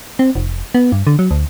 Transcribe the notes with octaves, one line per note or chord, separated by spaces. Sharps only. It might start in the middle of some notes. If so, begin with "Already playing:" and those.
C4
F1
B3
G2
D3
F#3
D2